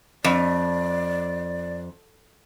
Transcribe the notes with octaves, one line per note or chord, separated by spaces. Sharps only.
F2 D5